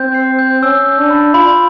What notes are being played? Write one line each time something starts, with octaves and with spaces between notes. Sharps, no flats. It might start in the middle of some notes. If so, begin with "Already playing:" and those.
Already playing: C4 G6
C7
G6
C#4 E6
G6
D4
B5
F4 B5